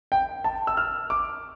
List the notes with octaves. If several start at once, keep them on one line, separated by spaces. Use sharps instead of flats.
G5
A5
E6
F6
D6